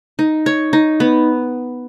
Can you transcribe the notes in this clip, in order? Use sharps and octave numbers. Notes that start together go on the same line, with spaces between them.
D#4
C#5
D#4
B3